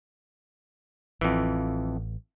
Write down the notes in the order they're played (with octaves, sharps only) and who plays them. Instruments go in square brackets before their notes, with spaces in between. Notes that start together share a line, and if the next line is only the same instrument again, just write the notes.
[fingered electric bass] A1 [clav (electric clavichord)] F2 E3